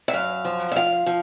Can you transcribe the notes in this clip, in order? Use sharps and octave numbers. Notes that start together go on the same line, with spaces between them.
E5
F#2 F5
F3
E5
F3 F5
F3